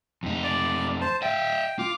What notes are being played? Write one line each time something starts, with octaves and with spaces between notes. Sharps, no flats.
F2 D#4
D5
C5 A5
D#5 E5 G5
F4 D6